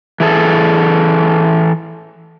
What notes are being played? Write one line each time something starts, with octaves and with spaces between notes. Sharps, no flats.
E3 G#4 A4